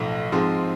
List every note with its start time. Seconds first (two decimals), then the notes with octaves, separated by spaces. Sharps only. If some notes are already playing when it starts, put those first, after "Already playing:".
Already playing: B1 A2 F3
0.32 G#2 F3 G#3 C4